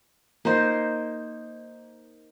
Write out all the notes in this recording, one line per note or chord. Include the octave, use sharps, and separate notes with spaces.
A#3 D#4 C5